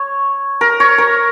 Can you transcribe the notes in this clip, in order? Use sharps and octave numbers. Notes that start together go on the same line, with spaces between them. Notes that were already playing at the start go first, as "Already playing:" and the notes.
Already playing: C#5
A#4
C#5
A#4